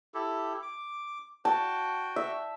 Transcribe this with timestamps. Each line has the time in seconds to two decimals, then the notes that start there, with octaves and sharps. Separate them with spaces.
0.14 E4 G4 A4
0.62 D6
1.45 F#4 G5 A5
2.16 E5